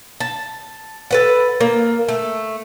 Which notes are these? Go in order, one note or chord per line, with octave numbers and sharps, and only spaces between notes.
A5
A4 B4 F#5
A#3
A3